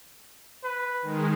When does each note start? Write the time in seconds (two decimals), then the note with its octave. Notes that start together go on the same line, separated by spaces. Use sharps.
0.64 B4
1.02 D#3 G#3